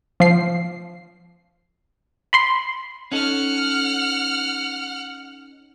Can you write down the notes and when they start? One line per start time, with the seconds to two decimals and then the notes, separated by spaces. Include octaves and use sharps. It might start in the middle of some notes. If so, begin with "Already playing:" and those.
0.20 F3 C7
2.33 B5 C6 C7
3.12 C#4 D#4 A4 F#5 F6